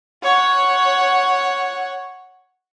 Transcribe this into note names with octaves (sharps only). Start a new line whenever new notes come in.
C#5 F#5